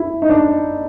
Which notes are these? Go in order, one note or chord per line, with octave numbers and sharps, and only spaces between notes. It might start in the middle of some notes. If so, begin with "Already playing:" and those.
Already playing: E4
D#4
D4